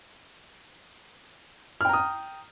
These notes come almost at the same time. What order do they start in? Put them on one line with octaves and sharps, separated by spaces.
F6 G5 A#5 D#6